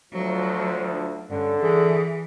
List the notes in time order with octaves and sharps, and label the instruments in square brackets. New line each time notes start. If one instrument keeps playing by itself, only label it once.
[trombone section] D2 F3 [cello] F#3 A3
[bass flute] D4
[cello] G2 [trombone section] D3 [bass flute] C#4
[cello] E3 [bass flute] G#4